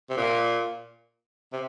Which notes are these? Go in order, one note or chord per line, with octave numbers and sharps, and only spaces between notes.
C3
A#2
C3